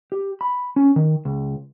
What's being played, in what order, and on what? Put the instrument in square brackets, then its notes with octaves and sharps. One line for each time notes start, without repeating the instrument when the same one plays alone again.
[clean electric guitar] G4
B5
C#4
D#3
C#2